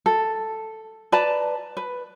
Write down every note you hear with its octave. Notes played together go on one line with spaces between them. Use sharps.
A4
B4 D5 A5 A#5
B4